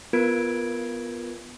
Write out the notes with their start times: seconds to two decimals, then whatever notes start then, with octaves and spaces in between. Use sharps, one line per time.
0.13 B3 F4 A#4 B4 G#6 D7